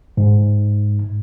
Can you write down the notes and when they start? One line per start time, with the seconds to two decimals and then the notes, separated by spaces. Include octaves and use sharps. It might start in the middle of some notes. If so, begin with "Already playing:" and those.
0.17 G#2